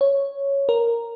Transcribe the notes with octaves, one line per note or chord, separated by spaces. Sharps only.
C#5
A#4